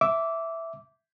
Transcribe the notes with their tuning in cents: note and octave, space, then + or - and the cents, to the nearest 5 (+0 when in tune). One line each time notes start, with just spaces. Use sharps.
E5 +0 D6 -15